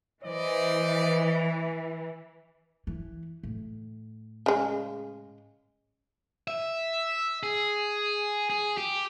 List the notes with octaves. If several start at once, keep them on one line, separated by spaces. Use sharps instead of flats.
E3 C5 D5 D#5
E3
A2
C#3 G#3
E5
G#4
G#4
G4